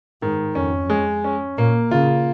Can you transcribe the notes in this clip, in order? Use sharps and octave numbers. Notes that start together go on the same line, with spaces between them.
G#2 D#3
F2 C#4
G#3
C#4
A#2 A#3
C#3 F4